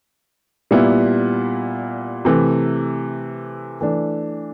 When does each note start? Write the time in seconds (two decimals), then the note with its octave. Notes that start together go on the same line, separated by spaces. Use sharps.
0.71 A#2 G3 B3 E4
2.25 C3 E3 A3
3.81 E3 A3 D4